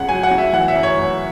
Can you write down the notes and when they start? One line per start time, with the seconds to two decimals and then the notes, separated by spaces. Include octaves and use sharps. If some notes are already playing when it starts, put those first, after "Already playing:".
Already playing: C#2 C#3 F#5
0.08 F#3 G#5
0.23 F#5
0.31 C#3
0.38 E5
0.53 E3 F#5
0.68 E5
0.76 F#2
0.83 C#5
0.98 F#2